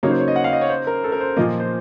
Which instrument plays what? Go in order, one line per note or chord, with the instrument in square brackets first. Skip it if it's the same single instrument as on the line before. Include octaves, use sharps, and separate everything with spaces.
[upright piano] C#3 F#3 A#3 D#4 [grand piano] C#5
[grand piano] C5
C#5
D#5
F#5
F5
D#5
C#5
C5
A#4
A4
A#4
C5
[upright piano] A#2 F3 A#3 [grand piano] D#5
[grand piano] C5